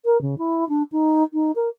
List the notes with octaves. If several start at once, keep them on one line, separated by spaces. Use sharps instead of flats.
A#4
C#3
E4
D4
D#4
D#4
A#4